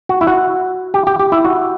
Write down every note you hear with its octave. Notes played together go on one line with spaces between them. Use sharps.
F#4
E4
F#4
G4
G4
G4
E4
F#4